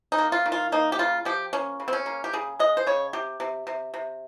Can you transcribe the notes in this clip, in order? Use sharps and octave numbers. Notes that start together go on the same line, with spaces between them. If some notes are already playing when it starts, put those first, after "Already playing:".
D#4
A#3
F4
D#3
F4
A#3 D#4
G4
C#3 F4
F3 G4
A#3 C#4
C#3
C4
C#4
A#3
G4
C#3 G#4
G#3 D#5
C5
C#3 C#5
C3 G4
C3
C3
C3